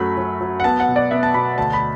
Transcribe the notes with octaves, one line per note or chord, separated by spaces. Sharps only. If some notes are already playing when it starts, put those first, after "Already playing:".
Already playing: F#2 F#3 A3 B5
F#3
F#3
F#5
B3 A5
F#5
B2
D5
B3 E5
A5
B2 B5
D2 A5
B5